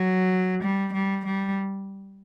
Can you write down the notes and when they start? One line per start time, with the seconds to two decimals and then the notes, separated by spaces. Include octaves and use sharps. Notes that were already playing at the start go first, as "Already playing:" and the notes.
Already playing: F#3
0.63 G3
0.93 G3
1.25 G3